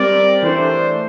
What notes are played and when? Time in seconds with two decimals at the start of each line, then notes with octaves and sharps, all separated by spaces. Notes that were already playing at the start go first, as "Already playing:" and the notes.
Already playing: G3 C4 G4 A#4 D5
0.43 E3 A3 D4 C5